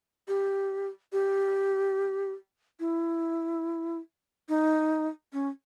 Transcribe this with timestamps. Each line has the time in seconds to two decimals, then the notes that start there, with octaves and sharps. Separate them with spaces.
0.28 G4
1.13 G4
2.80 E4
4.49 D#4
5.33 C#4